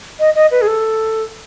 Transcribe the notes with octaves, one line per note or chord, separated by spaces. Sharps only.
D#5
D#5
B4
G#4
A4